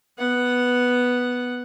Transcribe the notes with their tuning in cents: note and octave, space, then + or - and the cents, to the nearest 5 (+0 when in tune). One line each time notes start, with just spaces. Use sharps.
B3 +0 F#5 +0